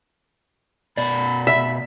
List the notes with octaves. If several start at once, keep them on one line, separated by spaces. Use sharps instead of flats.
B2 D5 B5
E5 B5